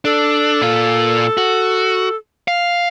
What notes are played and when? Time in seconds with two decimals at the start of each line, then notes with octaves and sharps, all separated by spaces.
0.05 D4 A4
0.62 A#2 F4
1.37 F#4
2.48 F5